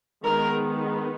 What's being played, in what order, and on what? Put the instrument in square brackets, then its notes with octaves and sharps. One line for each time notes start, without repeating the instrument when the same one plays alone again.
[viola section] D#3 G#3 B3 A#4